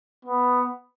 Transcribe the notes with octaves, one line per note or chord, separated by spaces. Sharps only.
B3